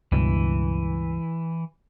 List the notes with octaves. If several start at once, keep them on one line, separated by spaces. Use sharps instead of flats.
C#2 G2 B2 E3